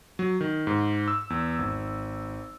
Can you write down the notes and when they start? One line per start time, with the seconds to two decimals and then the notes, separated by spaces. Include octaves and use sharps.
0.19 F#3
0.41 D#3
0.67 G#2
1.08 E6
1.30 E2
1.59 G#1